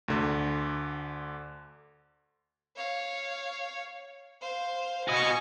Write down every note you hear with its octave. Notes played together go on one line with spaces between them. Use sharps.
D2 D3
C#5 F5
C5 F5
F#4 D#5 G#5 C#6